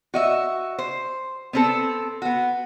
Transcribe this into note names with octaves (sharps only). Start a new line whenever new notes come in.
F#4 D#5 E5
C5
B3 C4 A4
B3 F#4